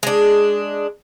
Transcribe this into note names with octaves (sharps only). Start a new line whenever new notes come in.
G#3 D4